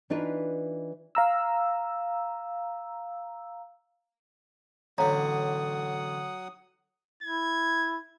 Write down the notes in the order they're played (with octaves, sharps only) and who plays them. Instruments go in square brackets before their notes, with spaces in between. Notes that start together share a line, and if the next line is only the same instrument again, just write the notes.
[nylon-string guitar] E3 D4 D#4 F4 B4
[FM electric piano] F5 A#5 E6
[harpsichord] A1 D3 [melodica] F#3 F#5 D#6 [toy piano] C#5 F5 A#5
[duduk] E4 [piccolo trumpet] G#6